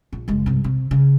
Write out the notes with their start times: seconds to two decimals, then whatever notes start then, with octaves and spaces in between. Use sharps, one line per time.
0.12 A#1
0.28 F#1 G#3
0.46 G2 C3
0.64 C3
0.91 C#3